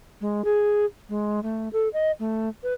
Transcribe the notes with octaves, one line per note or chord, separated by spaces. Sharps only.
G#3
G#4
G#3
A3
A4
D#5
A3
B4